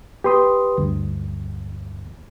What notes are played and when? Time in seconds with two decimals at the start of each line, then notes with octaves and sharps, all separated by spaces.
0.24 G4 B4 C6 D#6
0.78 D2 G2